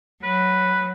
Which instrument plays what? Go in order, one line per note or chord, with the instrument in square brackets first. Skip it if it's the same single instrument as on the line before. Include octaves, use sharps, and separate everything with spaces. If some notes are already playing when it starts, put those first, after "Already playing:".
[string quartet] F#3 [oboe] B4